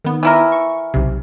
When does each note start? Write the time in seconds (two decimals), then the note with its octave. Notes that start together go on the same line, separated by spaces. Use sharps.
0.04 D#3 B3
0.23 E3 E4 A#4
0.52 C#6
0.94 B1 C3